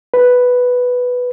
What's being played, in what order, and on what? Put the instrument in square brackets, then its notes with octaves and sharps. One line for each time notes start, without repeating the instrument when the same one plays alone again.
[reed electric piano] B4